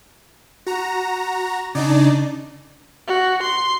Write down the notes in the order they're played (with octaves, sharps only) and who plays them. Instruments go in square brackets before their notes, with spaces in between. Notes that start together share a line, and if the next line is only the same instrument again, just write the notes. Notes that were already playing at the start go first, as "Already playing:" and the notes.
[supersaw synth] F#4 A#5
[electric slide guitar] C#3 [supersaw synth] D4 D#4 D5
[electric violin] F#4
C6